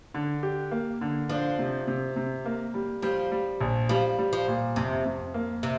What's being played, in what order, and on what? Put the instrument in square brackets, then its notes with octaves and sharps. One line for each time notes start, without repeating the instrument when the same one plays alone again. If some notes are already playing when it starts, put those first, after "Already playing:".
[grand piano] D3
G4
A#3
D3
[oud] F3 [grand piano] D4
[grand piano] C3
C3
C3
A#3
G3
[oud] F3 [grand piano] G3
[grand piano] G3
A#1
[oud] F3 [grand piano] G3
[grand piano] G3
[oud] F3
[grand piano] A#2
[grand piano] F2 [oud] C3
[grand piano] F2
A#3
[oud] C3